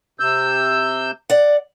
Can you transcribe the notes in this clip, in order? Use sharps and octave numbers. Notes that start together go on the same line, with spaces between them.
C3 E6 G6
D5 F#5